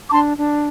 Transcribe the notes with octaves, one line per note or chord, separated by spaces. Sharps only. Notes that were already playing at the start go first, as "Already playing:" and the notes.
D6
D4 A5 C6
D4